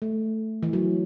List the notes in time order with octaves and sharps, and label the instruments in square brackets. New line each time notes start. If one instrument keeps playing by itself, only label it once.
[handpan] A3
E3
F#3